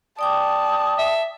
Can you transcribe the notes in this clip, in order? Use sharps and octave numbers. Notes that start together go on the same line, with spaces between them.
D5 G5 A5 D6 D#6
E5